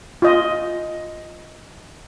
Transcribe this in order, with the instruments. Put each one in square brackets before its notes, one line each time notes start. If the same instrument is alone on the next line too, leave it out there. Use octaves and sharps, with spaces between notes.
[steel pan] F4 D#5